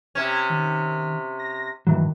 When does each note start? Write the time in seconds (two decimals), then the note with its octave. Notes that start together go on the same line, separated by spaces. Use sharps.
0.15 C3 C#4 G#6
0.50 D#3
1.39 A#6
1.87 G2 D#3 E3 F#3